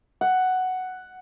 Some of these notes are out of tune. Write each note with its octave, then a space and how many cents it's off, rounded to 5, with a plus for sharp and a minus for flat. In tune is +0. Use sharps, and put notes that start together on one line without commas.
F#5 +5